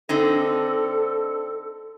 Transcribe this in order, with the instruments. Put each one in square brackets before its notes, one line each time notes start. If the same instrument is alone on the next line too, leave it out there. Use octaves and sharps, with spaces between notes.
[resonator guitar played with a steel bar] D3 C4 D#4 [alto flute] A4